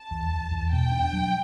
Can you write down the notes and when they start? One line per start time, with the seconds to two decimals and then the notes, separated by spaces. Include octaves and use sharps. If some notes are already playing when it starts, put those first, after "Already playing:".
Already playing: A5
0.11 E2
0.31 E2
0.51 E2
0.72 B2 G5
0.92 D4
1.13 F#3